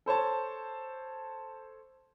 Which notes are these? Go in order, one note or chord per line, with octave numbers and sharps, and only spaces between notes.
A4 C5 C#5 A5